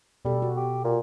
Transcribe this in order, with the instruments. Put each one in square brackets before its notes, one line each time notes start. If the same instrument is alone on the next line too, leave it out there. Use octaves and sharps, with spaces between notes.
[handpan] B2 A4 [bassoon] G3
[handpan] F#4
[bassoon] G4
A#2